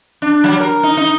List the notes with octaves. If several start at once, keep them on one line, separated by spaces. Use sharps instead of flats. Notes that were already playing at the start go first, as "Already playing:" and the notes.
D4
F#3
A#4
D#4
D#4